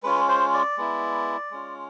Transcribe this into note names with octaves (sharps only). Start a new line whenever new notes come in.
G#3 C#4 F4 B4
C5
D5
G#3 B3 E4
G#3 C#4 F4